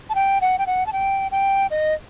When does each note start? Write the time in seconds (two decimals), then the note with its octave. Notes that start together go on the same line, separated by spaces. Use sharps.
0.10 A5
0.15 G5
0.41 F#5
0.59 G5
0.67 F#5
0.86 A5
0.93 G5
1.32 G5
1.71 D#5